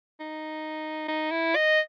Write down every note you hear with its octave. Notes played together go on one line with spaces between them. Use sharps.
D#4
D#4
E4
D#5